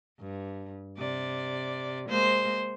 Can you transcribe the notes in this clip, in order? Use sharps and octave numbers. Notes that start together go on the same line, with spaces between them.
G2
C3 D5
G#3 A#3 C5